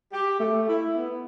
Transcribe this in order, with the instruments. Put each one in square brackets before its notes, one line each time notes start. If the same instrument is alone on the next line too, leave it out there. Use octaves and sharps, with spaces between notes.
[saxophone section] G4
A3
E4
B3